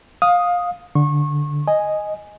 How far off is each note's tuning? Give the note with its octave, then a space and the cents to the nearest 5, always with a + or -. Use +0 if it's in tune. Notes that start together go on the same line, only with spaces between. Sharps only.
F5 +20 D#6 +0
D3 +0 C#6 -30
D#5 +0 G#5 +0